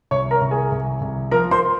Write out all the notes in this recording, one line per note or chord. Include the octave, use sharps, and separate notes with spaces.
C2 C#5 C#6
A#4 A#5
C2
G#4 G#5
C2
C2
F3 A#4 A#5
C5 C6